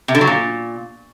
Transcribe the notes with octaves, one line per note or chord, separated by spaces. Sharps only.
C3
D3
F#3
A#2